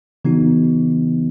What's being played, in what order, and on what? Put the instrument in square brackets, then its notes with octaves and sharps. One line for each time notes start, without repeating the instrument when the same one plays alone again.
[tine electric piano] C#3 E3 B3 D#4 F#4